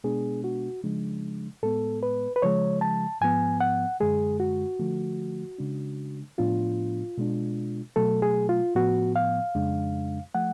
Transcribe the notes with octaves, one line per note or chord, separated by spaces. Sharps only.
B2 G#3 B3 D4 G#4
F#4
C#3 F3 G#3 D4
A2 G#3 B3 A4
B4
B4
C#3 F3 G#3 C#5
A5
G#2 F3 B3 G#5
F#5
F#2 D3 G#3 G#4
F#4
D3 F3 A3
C#3 G#3 D4
A2 F3 B3 D4 F4
B2 G#3 D4
B2 F#3 A3 A4
G#4
F4
A2 F3 B3 F#4
F5
F2 C#3 G#3 D4
F3 A3 F#5